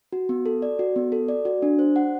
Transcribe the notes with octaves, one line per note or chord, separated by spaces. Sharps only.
F#4
B3
A4
D5
F#4
B3
A4
D5
F#4
D4
C5
F#5